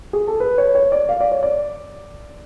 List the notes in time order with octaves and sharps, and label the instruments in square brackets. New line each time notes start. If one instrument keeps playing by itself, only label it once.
[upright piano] G#4
A4
B4
C#5
C#5
D5
F5
D5
C#5
D5